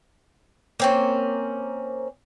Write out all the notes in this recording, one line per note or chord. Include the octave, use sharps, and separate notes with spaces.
A#3 C4 C#4